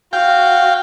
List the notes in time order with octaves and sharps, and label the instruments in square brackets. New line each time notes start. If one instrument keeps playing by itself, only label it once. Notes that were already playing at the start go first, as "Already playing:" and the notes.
[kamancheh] F#4 [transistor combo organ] F5 G5